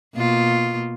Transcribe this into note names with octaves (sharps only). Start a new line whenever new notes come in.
B2 A#3 F4